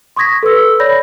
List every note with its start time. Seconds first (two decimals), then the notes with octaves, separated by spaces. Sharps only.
0.16 C6 C#6 D#6 G#6 A#6 B6
0.43 A4 B4 E6
0.80 C#5 D5 B5 G6 A#6